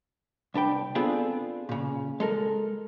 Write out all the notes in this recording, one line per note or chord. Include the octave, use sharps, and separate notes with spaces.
C2 D4 B4 G5
B3 C4 D4 F4 G#4 A4
A#2 C#3
G#3 A4 A#4